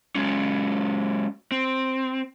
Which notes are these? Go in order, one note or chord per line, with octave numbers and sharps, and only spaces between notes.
F#3 G#3 C#4
C4